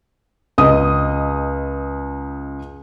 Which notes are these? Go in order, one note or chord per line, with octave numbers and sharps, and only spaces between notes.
C#2 D#5 D#6